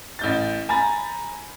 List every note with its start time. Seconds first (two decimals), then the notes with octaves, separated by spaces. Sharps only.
0.19 A1 G6 A6
0.69 G#5 A#5 B5 A6